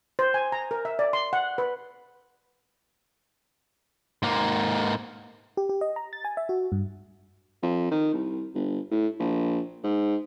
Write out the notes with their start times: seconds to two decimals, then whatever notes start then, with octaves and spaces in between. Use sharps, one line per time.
0.19 C5
0.34 G#5
0.52 A#5
0.71 A#4
0.85 E5
0.99 D5
1.13 C6
1.33 F#5
1.58 B4
4.23 G#2 A#3
5.57 G4
5.69 G4
5.81 D#5
5.96 A#5
6.13 A6
6.25 G#5
6.37 E5
6.49 F#4
6.72 G2
7.63 F2
7.91 D#3
8.13 C2
8.55 G1
8.91 A2
9.19 A#1
9.84 G#2